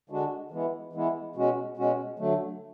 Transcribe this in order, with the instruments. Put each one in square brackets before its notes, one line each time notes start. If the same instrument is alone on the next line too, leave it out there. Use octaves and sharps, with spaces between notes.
[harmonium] D3 G#3 D4 F#4
E3 G#3 B3 E4
E3 G#3 B3 E4
B2 G#3 C#4 F#4
B2 G#3 C#4 F#4
D3 F#3 A3